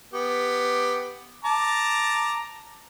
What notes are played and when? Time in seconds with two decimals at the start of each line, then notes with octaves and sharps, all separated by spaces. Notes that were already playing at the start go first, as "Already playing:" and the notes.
0.13 B3 G4
1.45 A5 A#5 D6